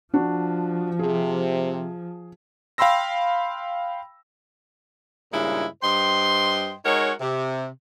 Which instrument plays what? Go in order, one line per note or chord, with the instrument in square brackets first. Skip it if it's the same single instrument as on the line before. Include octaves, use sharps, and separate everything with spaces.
[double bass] F3 [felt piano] D4 F#4
[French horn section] C3 [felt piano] G#4
[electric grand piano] F5 G5 B5 C6 E6 A#6
[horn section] G2 A#2 C#3 G#3 D#4 E4
G2 C5 D#5 G5 C6
G#3 D#4 F#4 A#4 C#5
C3